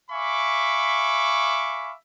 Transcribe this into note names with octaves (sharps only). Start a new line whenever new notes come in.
E5 F5 G#5 B5 C#6 D6